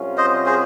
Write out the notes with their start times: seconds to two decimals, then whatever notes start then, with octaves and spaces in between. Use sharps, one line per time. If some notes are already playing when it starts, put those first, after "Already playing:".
Already playing: C2 C3 F#3 C#4 F4
0.18 C5 D#5
0.46 G#4 C5